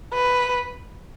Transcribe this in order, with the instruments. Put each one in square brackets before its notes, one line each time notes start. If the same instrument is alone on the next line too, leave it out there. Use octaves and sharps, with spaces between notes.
[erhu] B4